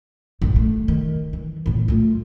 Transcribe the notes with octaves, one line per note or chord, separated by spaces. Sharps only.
A1 F#2
A3
D#3
E3
E2 A2
A3 F4